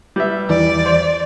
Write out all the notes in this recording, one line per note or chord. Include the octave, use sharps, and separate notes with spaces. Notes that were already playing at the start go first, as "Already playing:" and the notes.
G3 B4 E5
E2 E3 D5
C5